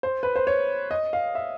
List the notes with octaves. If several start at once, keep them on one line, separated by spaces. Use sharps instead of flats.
C5
B4
C5
C#5
D#5
F5
E5